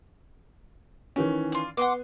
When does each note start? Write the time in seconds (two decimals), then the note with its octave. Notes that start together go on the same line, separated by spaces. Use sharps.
1.16 D#3 E3 C#4
1.52 F4 D5
1.77 B3 F#5 C6 D6